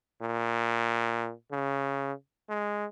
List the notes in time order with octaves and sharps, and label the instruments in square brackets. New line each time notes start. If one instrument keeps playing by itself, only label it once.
[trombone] A#2
C#3
G#3